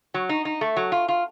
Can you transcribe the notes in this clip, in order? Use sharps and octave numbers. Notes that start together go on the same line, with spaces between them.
F#3
D#4
D#4
A3
F#3
F4
F4